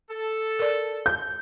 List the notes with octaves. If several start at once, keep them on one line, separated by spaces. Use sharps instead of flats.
A4
A#4 D5
G6